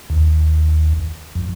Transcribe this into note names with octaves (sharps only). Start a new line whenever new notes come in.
D#2
F2